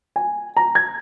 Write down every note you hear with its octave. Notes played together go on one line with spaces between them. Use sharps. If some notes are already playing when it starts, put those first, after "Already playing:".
G#5
A#5
G#6